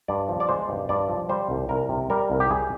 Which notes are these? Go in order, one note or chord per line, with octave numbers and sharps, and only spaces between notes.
G2 D5
F3
D5
G#3 C5
G2
G2 D5
F3
G3 C5
C2
C2 A#4
C3
G3 A#4
C2
G4
C2 G#4